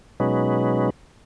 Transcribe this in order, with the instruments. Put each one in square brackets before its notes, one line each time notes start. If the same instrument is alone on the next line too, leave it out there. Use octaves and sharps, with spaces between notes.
[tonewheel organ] B2 F#3 G#3 C#4 D#4 B4